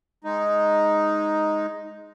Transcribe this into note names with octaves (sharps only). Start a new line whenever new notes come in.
G#3 D#4